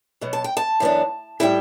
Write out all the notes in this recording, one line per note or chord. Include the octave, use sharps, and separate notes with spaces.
B2 F#3 B3
A5
G5
A5
F#2 E3 B3 D4
A2 G3 C#4 E4 G5